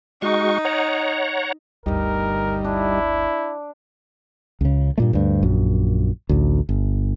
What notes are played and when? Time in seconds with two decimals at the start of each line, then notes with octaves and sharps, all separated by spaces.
0.22 G#3 D#4 F#4 C#6
0.65 C#5 F#5 A#5
1.86 G1 D2 G2 G3 D#4 A#4
2.64 D4 E4
4.61 C#2 C#3
4.98 G2 A#2 A3
5.13 D2 G2
5.43 A#1 F#2
6.29 A1 D2
6.69 G1